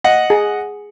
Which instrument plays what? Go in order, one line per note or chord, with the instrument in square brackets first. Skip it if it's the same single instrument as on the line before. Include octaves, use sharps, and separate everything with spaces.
[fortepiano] D#5 F#5
[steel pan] G#4